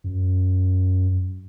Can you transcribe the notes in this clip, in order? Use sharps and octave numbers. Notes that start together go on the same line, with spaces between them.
F#2